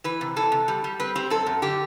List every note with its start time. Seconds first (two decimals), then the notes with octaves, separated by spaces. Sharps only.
0.04 E3 B4
0.21 C3
0.36 E3 A4
0.52 C3
0.68 G3
0.84 G3
1.00 C4 B4
1.15 C4 G4
1.30 F#2 A4
1.46 F#2
1.62 D3 G4